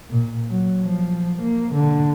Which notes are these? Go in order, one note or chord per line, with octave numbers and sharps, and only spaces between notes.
A#2
F#3
F3
A#3
D3